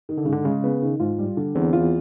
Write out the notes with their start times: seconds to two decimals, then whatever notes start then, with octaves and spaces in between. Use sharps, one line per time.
0.09 D#3
0.17 D3
0.25 G#2 C#3
0.33 D3
0.45 C#3 G#3
0.64 B3
0.82 D#3
1.00 G#2 F4
1.18 G3
1.37 D3
1.55 E2 C4
1.73 F4